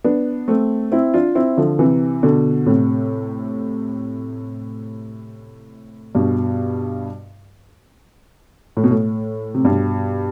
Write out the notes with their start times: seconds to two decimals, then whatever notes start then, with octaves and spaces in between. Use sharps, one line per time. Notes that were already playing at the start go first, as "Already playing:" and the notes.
0.04 B3 D4
0.48 A3 C4
0.92 C4 E4
1.14 D4 F4
1.35 C4 E4
1.57 D3 F3
1.79 C3 E3
2.23 B2 D3
2.66 A2 C3
6.15 G2 B2
8.77 A2
8.84 B2
8.91 A2
9.55 C3
9.64 G2 B2